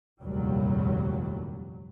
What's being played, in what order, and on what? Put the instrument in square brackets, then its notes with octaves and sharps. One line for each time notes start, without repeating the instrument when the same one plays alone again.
[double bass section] F1 A#1 D#2 F#3 G3